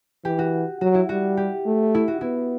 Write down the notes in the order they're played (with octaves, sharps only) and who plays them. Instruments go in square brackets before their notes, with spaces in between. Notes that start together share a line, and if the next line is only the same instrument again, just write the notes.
[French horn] E3 [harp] G4
[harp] F#4
[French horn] F#3 [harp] F#4
[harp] E4
[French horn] G3 [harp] F#4
[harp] G4
[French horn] A3
[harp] E4
F#4
[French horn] B3 [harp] E4